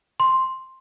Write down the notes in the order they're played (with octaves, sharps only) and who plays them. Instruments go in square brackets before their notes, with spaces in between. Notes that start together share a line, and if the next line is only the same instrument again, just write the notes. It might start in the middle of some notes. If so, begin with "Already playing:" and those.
[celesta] C6